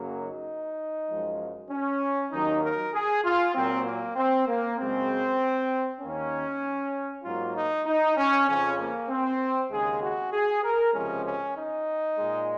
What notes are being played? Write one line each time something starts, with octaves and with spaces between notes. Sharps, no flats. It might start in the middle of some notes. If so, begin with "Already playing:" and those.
Already playing: F#2 C#3 F#3 A#3
D#4
F#2 F3 G#3
C#4
D#2 D#3 F#3 D#4
A#4
G#4
F4
A#2 F#3 A#3 C4
A#3
C4
A#3
F#2 C#3 G#3 C4
D#2 D#3 A#3 C#4
G#2 F#3 A#3 F4
D#4
D#4
C#4
F2 C#3 F3 C#4
A#3
C4
D#2 C#3 G#3 G#4
F#4
G#4
A#4
C#2 C3 F3 G#3 C#4
C#4
D#4
A#2 G#3